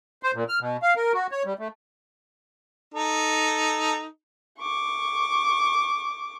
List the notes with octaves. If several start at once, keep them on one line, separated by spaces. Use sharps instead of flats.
C5
A#2
F6
B2
F5
A#4
F#4
C#5
G3
A3
D#4 A4
C#6 D6